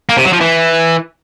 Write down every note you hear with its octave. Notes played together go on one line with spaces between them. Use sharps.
A#3
C3
F#3
F3
E3